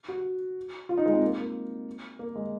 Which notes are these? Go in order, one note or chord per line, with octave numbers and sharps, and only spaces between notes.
F#4
F4
D#4
G#3
C4
A#3
A#3
A#3
G#3